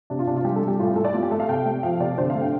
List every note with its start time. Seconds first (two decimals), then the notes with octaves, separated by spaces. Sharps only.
0.10 C3 D4
0.19 F4
0.27 C3 D4
0.36 F4
0.44 G3 G4
0.56 A4
0.62 G3
0.68 G4
0.79 A2 F4
0.87 G4
0.96 A2 A4
1.05 D5
1.14 A3 F4
1.23 G4
1.31 A3 A4
1.40 F5
1.49 C3 G5
1.66 A3
1.83 F3 F5
2.00 C3 D5
2.18 D3 C5
2.30 F5
2.35 A3
2.42 G5